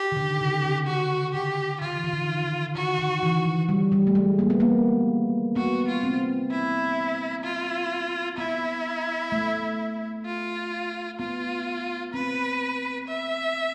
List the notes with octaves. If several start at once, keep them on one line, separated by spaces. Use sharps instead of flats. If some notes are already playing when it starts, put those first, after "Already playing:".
Already playing: G4
D#3
D3
C#3
D3
C#3 F#4
D3 G4
D#3 F4
E3
D#3
D3
D#3
D3 F#4
D#3
E3
F3
G3
G3
A3
G#3
A#3
B3
A#3
B3 F#4
F4
C4
E4
F4
B3 E4
A3
F4
B3 F4
C4 B4
E5